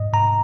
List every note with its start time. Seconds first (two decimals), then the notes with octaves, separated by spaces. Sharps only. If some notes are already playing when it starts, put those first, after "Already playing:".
Already playing: G#2 D#5
0.13 G#2 A#5